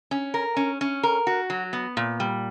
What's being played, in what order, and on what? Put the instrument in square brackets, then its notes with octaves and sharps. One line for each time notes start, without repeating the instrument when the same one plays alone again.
[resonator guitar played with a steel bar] C#4
A#4
C#4
C#4
A#4
F#4
F#3
B3
A#2
G3